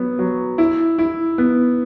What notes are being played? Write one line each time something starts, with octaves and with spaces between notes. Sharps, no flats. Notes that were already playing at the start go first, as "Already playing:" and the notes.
Already playing: F#3 B3
F#3
E4
E4
B3